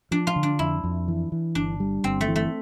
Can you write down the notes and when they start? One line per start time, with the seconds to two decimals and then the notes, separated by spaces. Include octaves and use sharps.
0.11 F3 D4
0.27 F4
0.36 D3
0.43 D4
0.59 F2 E4
0.84 F2
1.08 E3
1.32 E3
1.55 G1 D4
1.80 G3
2.04 G1 C4
2.21 A3
2.28 E3
2.36 A3